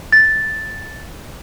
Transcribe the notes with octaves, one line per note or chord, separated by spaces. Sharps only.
A6